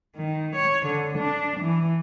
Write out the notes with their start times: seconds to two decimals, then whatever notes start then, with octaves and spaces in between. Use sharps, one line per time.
0.16 D#3
0.55 C#5
0.86 D3
1.18 D4
1.60 E3